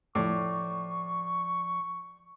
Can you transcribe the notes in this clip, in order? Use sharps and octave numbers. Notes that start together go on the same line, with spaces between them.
A2 F3 D5 C#6 D6